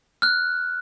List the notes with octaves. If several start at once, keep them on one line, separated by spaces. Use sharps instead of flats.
F6 F#6